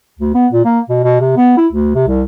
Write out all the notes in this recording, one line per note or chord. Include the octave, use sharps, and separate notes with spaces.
D2
B3
A#2
A#3
B2
B2
C3
B3
E4
D2
C3
C2